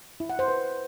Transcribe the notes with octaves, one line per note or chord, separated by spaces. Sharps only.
E4
F#5
C5
B4